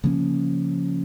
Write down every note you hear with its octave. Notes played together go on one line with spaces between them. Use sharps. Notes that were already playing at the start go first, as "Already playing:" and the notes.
C#3 F3 A#3 C#4